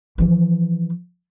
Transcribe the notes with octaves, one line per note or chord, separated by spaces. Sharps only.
E3 F3